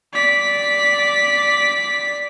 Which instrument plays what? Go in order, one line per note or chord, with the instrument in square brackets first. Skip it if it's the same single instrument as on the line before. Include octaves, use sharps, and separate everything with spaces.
[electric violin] D5 B6